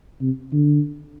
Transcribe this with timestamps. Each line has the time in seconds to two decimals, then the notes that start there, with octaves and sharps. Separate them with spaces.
0.21 C3
0.53 D3